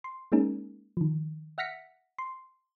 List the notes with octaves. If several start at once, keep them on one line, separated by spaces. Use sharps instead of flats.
C6
G#3 A#3 C#4 D#4 G#4 A#4
D#3 F3
E5 F#5 F6 A#6 B6 C#7
C6